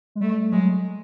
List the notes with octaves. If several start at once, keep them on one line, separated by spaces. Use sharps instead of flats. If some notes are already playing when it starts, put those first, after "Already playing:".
G#3
G3 A3
F#3 G#3